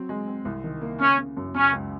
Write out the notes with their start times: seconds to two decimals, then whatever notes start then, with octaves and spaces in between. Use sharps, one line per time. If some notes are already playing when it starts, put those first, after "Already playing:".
Already playing: F#3 C4
0.09 G#3
0.28 C4
0.45 C2
0.64 D#3
0.81 A#3
1.00 C#3 C#4
1.18 C#3
1.37 F#2
1.54 C#3 C#4
1.73 C#2